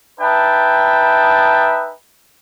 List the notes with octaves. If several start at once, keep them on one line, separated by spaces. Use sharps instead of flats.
D#4 B4 E5 G5 A5